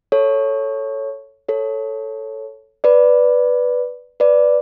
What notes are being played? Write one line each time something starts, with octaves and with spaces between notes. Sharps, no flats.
A4 C#5
A4 C#5
B4 D5
B4 D5